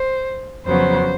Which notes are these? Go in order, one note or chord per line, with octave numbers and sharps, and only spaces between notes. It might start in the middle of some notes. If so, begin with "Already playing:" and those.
Already playing: C5
F2 C#3 F#3 B3 C5